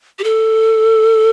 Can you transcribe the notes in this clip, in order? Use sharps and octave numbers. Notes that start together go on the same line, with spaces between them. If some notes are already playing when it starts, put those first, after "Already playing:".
G4
A4